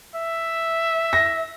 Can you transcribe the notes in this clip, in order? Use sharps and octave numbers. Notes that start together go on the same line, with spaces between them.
E5
A#6